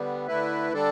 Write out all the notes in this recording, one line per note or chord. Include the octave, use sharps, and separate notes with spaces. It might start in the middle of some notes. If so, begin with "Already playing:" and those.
Already playing: D3 G3 B3
D3 A3 E4 B4
D3 G3 D4 A4